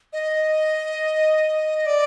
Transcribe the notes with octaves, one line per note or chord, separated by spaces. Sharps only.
D#5
D5